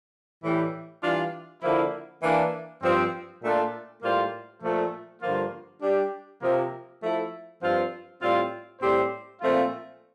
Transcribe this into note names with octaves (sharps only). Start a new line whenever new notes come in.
A2 E3 G3
E3 G3 D4 F4
D3 F3 A#3 E4
E3 A#3 D4
G2 F3 C4
A#2 A3 D4 F4 A4
A2 G3 A#3 F4 C5
A#2 F3 A3
G2 D3 F3 A#3 F4
G3 D4 G4
C3 F3 A#3
F3 A3 E4 A4
G2 F3 C4 F4
A2 G3 C4 F4
A2 G3 C4 G4 C5
A#2 F3 A3 C4 F4